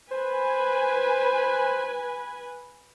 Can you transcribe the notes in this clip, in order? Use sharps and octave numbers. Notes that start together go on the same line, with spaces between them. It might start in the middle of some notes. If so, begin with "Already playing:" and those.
B4 C5 G#5